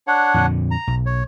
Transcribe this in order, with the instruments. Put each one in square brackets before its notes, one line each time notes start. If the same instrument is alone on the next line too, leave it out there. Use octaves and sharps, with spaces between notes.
[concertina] D4 C#5 F#5
[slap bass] F2 A#2 D3
[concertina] A#5
[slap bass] B1
[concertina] C#5